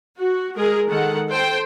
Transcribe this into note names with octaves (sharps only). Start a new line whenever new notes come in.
F#4
G#3 G#4 A#4
D#3 G#3 A4 F#5
A4 C5 G5